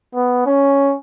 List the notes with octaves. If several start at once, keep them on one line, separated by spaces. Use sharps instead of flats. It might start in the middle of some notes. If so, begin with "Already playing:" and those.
B3
C#4